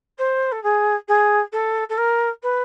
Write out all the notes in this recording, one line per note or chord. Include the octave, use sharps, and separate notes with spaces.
C5
A4
G#4
G#4
A4
A4
A#4
B4